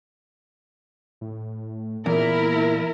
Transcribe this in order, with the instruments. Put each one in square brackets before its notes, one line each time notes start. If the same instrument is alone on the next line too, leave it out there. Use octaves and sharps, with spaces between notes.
[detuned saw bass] A2
[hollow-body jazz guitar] E2 [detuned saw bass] A#2 [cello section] E4 A#4